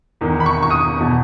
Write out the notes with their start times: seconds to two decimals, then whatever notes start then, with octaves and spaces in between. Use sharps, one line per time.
0.21 E2 D#3
0.40 B5
0.46 C#6
0.62 C#6
0.70 D#6
0.95 E2
1.01 B2